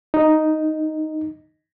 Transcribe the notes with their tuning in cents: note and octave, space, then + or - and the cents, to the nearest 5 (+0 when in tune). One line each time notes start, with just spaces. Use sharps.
D#4 +0